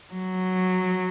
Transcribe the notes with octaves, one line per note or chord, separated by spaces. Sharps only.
F#3